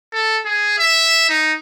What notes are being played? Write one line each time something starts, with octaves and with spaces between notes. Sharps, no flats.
A4
G#4
E5
D#4